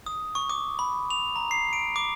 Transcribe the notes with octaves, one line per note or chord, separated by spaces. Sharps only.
D#6
C#6
D6
B5
F7
A#5
C7
D7
D6